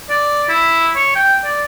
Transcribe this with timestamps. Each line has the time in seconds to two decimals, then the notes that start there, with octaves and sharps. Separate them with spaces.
0.10 D5
0.49 E4
0.96 C#5
1.16 G5
1.44 D5